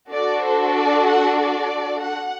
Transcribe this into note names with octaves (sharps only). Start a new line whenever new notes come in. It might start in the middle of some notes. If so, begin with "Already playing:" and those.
D4 F#4 A4 D5
C5
D5
F#5
D5
F#5